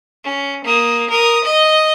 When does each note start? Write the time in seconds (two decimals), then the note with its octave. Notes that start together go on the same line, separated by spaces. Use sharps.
0.25 C#4
0.65 A#3 D#6
1.10 A#4 D#6
1.44 D#5